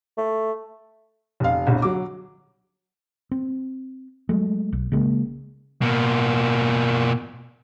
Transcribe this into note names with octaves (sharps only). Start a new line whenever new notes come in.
A3
F1 F5
G1 C2
F#3 D6
C4
F#3 G#3 A3
B1
C#3 G#3 A#3
B2 A#3